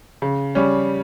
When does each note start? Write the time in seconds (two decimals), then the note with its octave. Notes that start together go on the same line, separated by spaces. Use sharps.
0.22 C#3
0.55 G3 C#4